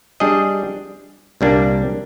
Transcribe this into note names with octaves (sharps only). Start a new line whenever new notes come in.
G3 D4 G#4 D#5
C2 A#2 G3 A#3 D4